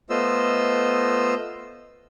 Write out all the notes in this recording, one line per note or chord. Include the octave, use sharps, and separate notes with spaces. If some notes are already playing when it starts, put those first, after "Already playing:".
A3 B3 F4 C5 D#5 E6